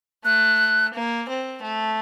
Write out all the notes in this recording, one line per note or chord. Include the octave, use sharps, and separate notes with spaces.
A3 F#6
A#3
C4
A3